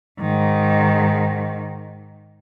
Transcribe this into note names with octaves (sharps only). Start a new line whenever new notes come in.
G#2 D#3